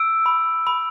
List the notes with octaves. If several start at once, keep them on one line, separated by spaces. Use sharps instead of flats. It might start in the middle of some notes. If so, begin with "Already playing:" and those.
Already playing: E6 D7
B5
B5